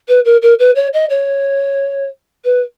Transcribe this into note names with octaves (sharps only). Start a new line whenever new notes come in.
B4
A#4
A#4
B4
C#5
D#5
C#5
B4